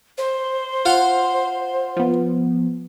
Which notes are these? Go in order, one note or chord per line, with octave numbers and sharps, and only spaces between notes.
C5
F4 F5 F#5
F3 B3